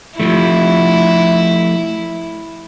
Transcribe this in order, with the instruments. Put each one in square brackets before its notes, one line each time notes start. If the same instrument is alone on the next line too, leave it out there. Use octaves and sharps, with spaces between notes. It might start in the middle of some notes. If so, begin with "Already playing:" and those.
[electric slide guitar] F3 A3 [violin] E4